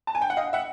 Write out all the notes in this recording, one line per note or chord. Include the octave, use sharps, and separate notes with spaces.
A5
G#5
G5
F#5
D#5 F5
E5 F#5